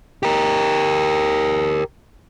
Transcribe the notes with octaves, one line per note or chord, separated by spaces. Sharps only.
G4 A#4